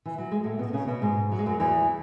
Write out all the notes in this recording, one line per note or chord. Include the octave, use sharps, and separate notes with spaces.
E3
F#3
G#3
A2 A3
B2 B3
C#3 C#4
B2 B3
G#2 G#3
F#3
G#3
F#2 F#3
E2 E3